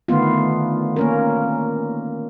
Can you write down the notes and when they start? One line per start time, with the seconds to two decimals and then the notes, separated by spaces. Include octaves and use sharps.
0.08 D3 D#3 A3 B3 F4
0.96 A#3 C#4 A#4